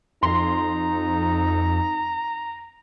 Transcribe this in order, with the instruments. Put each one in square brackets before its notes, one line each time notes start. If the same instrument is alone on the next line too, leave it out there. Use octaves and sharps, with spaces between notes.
[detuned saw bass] F2 [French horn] D#4 [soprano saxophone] A#5 [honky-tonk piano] C6